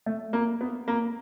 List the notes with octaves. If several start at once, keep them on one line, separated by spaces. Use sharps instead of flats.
A3
A#3
B3
A#3